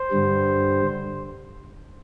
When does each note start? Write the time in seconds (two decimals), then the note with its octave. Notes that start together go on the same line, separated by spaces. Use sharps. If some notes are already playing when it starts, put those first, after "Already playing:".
Already playing: C5
0.11 G2 D3 G3